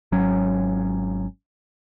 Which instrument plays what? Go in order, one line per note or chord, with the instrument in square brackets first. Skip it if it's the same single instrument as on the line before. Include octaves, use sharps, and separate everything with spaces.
[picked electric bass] G#1 F#3 C#4